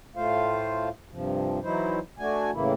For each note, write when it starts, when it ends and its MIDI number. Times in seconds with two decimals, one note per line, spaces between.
0.16 0.89 45
0.16 0.89 57
0.16 0.89 65
0.16 0.89 72
0.16 0.89 77
1.11 1.59 43
1.11 1.59 48
1.11 1.59 53
1.63 1.99 52
1.63 1.99 54
1.63 1.99 63
1.63 1.99 64
1.63 1.99 72
2.19 2.51 57
2.19 2.51 62
2.19 2.51 66
2.19 2.51 80
2.53 2.73 45
2.53 2.73 49
2.53 2.73 52
2.53 2.73 58
2.53 2.73 64